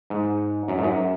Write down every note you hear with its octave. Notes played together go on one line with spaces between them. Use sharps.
G#2
F#2
G#2
F#2